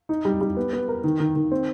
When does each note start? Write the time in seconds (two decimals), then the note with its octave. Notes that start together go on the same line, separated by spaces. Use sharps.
0.09 D#4
0.25 G3
0.41 G3
0.57 B3
0.73 B3
0.88 A#4
1.04 D#3
1.20 D#3
1.36 D#3
1.52 C4